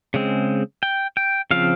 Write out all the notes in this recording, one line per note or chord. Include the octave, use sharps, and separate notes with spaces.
C#3 G#3 C4
G5
G5
C#3 F3 C4 F5